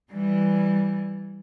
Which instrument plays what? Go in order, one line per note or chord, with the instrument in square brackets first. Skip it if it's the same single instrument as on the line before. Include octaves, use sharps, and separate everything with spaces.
[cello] E3 G3